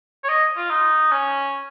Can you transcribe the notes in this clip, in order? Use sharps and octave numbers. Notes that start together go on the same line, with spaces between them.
C#5
D#5
F4
D#4
C#4